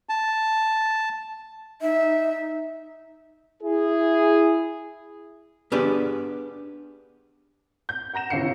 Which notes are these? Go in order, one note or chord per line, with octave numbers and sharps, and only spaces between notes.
A5
D#4 E5
E4 G#4
B3 D4 G4 G#4 B4 D5
G6
F#5 A#5 A#6 E7
G1 C3 E4 F5 C7 C#7